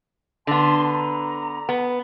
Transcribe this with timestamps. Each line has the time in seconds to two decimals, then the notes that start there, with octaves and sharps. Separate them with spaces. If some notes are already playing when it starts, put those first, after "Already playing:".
0.47 D3 B3 A5 C6
0.92 A#5
1.69 B3